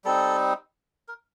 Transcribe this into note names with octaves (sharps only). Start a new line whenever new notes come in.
G3 C4 D#4 A4
A#4